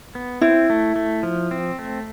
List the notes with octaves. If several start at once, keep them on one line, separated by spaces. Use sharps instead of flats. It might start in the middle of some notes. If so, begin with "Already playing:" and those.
B3
C4 E4
A3
A3
F3
C4
A3